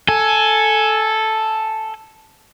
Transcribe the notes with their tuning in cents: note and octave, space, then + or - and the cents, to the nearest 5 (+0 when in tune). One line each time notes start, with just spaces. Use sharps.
A4 +0 G#5 +10